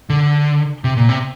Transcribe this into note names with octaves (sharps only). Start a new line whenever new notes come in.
D3
C3
A#2
C3